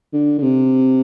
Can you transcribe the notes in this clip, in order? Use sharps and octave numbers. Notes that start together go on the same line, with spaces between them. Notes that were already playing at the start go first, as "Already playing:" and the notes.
D3
D3
C3